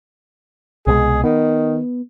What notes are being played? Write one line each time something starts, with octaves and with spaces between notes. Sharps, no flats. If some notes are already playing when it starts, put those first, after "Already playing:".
C2 B2 G#3 G#4
D#3 B3